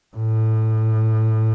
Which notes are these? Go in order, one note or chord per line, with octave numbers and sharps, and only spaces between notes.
A2